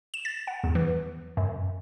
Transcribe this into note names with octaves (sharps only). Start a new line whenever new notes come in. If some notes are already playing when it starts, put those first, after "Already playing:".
E7
A6
F#5
E2
E3
F#2